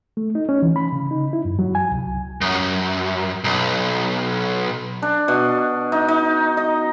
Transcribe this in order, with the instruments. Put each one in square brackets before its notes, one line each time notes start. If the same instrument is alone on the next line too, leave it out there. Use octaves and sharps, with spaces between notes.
[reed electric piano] A3
D#4
C#4
E3
B5
C#3
D#4
E4
F#2
F#3
G#5
C2
[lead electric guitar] F#2
B1
[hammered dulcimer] D4
B2
D#4
D#4
D#5